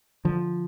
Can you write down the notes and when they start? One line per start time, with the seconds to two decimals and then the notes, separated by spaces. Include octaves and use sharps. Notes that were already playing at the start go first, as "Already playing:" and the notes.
0.25 D3 F3